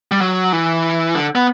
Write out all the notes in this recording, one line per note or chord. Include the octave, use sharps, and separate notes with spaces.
G3
F#3
E3
D3
B3